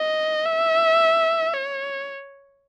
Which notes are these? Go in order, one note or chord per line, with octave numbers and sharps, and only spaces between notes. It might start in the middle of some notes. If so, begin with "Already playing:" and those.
Already playing: D#5
E5
C#5